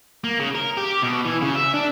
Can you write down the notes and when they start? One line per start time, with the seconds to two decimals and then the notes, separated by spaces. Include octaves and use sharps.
0.24 A#3
0.40 C#3
0.55 A#4
0.77 G4
1.02 B2
1.25 E3
1.42 C#3
1.55 E5
1.74 D4